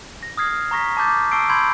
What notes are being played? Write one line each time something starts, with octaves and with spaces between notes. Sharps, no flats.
A#6
D#6 F6 G#6 C7
A#5 C#6 A#6 B6
A5 D6 G6 A6
A5 C#6 E6 C7 D7
B5 C6 E6 G6 G#6 D7